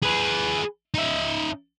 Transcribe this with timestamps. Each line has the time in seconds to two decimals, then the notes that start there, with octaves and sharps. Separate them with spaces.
0.03 G#4 B4
0.94 D#4 E5